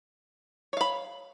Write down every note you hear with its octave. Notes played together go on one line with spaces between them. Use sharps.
C#5 F5 B5